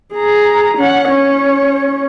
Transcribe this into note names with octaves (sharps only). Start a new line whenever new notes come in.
G#4 A#5
C#4 F#5
C#4 C#5